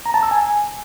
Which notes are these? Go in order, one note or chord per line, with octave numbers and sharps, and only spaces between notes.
A#5
A5
E6
G#5